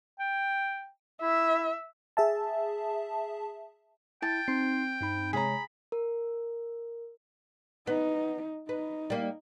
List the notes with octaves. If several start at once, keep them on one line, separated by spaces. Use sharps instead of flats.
G5
E4 E5
G#4 E5 A5
E4 G5 A5
C4 D#4 C6 C7
G2 D#4 B5
C3 G#3 G#4 C#5 A#5 B5
A#4
B3 D#4
D#4 B4
G3 A#3